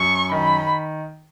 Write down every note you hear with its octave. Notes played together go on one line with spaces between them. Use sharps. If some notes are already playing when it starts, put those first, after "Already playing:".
Already playing: F#2 C#6
D#3 B5